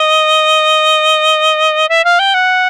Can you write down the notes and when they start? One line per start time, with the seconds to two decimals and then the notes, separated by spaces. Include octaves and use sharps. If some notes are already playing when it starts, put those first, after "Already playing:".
Already playing: D#5
1.89 E5
2.04 F5
2.19 G5
2.34 F#5